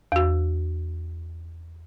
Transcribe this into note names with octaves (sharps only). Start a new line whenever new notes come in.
E2 F#4